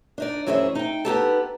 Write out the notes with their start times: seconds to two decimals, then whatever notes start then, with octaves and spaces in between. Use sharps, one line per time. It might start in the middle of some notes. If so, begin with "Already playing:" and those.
0.18 D4 D#4 D5
0.46 F#2 E3 C#4 G#4 C5 E5
0.75 D#4 G5
1.05 B3 D#4 G4 A4